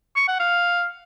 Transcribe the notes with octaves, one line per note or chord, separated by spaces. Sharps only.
C#6
F#5
F5